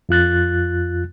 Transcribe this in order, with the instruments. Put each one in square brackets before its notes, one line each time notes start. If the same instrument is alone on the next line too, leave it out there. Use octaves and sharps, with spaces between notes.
[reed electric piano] F2 F4 F#6 A6